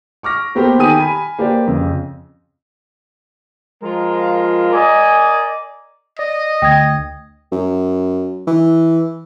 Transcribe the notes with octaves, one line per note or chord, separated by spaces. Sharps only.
C#6 D6 F6 A#6
A#3 B3 G4 A4 A#4 C5
D#3 G4 G5 G#5 D#6 D#7
G#5 B5
A#3 G4 B4 C5 D5
F2 C#3
F3 G#3 F4 A#4
A#4 D5 D#5 G#5
D5 D#5
D2 G5 D#6 G#6
F#2
E3